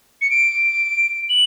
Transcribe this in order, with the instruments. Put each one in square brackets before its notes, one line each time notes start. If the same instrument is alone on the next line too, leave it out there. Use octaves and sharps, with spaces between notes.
[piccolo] C#7
D7
F#7